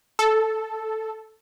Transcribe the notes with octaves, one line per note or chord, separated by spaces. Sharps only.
A4